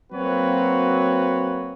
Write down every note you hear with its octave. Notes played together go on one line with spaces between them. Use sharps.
F#3 A#3 C4 F#4 B4 C#5